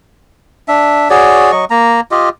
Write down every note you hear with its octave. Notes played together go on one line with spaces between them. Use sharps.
D4 E5
F#4 G#4 C#5 D5
F#3 D#5 C#6
A#3 A#5
F4 G4 D#5